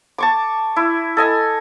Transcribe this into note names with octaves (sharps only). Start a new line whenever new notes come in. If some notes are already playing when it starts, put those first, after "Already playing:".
A5 C#6 D6
E4
A4 D#5 G#5